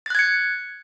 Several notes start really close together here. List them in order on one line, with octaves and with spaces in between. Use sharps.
A6 F#6 G#6 C#7